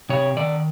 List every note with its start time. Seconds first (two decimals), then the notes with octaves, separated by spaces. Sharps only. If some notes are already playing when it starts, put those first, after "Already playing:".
0.09 C3 C#5
0.37 D#3 D5